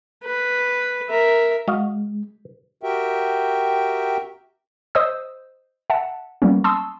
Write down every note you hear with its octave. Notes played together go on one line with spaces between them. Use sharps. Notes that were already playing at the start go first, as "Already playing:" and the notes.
B4
A#4 E5
G#3 F#4 D#5 F5
F#4 G4 A#4 E5 G5
C5 D#5 D#6 E6
E5 F#5 A5
F#3 G3 A#3 B3 C#4
A5 C6 C#6 D#6 E6